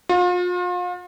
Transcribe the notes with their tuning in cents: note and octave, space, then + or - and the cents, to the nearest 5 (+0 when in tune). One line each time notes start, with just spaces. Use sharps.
F4 +40